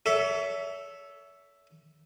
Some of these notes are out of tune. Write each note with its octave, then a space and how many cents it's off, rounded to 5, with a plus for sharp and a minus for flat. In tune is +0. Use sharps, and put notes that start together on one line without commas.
A4 +0 C#5 +35 E5 +0